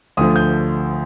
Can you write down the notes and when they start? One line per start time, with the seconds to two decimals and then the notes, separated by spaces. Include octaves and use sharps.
0.17 D2 D3 F3 D#6
0.36 G6